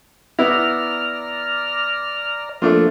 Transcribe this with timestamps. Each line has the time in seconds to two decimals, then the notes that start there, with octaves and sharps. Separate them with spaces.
0.39 B3 E4 D5 A#5 F6
2.62 F3 A3 A#3 D4 F4